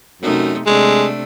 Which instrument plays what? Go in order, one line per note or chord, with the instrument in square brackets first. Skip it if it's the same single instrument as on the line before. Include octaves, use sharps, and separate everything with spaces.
[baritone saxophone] F#2 [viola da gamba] C3 A3 D#4
[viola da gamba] C3 A3 D4 [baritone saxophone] G#3